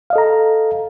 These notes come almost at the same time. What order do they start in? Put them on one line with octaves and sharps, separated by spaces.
F5 D#5 A4 A#5